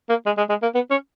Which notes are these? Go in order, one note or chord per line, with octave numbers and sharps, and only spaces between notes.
A#3
G#3
G#3
G#3
A#3
B3
C#4